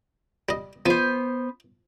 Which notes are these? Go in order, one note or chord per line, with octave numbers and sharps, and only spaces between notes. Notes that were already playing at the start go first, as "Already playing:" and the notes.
G3 D#5
F3 B3 C5